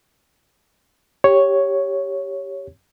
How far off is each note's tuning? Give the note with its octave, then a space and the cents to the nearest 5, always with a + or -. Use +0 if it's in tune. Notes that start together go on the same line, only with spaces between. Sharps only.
G4 +0 C#5 +0